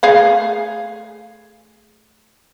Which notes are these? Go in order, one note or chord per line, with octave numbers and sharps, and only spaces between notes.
A3 G#4 F5